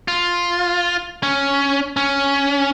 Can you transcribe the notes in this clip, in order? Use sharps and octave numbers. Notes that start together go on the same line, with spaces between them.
F4
C#4
C#4